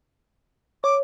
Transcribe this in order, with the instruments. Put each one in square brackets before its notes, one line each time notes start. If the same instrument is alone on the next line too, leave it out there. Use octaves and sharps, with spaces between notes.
[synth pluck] C#5 [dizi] D6